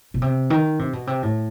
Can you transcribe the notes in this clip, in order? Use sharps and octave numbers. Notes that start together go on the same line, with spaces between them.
B2
C3
D#3
C3
B2
C3
A2